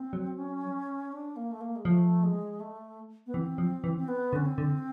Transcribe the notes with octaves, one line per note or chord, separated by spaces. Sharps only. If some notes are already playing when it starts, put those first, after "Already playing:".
Already playing: C4
F#3
C#4
D4
A#3
A3
A#3
G#3
F3 A3
G#3
A3
B3
E3 C4
F3
E3
C4
B3
D3
C#4
C4
D3